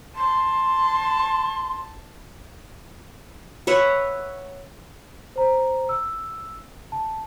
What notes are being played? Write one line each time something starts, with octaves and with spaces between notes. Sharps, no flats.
A5 C6
B4 C#5 E5 F#5
C5 A#5
E6
A5